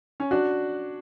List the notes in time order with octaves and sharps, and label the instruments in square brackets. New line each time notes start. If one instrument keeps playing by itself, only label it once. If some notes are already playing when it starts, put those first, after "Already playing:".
[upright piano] C#4
[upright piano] D4 [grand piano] F#4